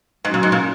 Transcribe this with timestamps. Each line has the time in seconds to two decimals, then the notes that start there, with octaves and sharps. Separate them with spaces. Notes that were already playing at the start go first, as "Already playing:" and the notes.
0.24 G#2 F#3 C#4 F#4
0.34 A#2
0.43 G#2
0.52 A#2